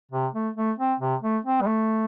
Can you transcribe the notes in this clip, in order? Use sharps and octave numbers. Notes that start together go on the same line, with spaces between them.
C3
A3
A3
C4
C3
A3
C4
G3
A3